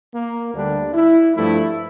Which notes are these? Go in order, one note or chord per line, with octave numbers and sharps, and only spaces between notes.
A#3
D2 D3 G3 D4
E4
G2 F3 A3 E4